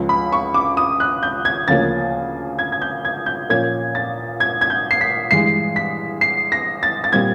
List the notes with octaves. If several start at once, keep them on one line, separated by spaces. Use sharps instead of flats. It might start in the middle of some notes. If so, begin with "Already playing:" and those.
Already playing: C#2 C#3 F3
B5
C#6
D6
D#6
F#6
G6
G#6
D2 C#3 F3 A#3 C#4 A6
G#6
G#6
G6
G#6
G6
A#2 F3 A#3 C#4 G#6
A6
G#6
G#6
G6
C7
B6
G2 E3 G#3 C7
B6
C7
A#6
A6
A6
A#2 G3 C4 G#6